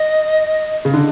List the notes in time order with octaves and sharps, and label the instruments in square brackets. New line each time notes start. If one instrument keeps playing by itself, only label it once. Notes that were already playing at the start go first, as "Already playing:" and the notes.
Already playing: [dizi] D#5
[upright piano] C#3
D3